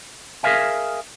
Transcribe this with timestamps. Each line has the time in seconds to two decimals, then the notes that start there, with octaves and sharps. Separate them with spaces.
0.43 G#4 A#4 D5 E5 F5 G#5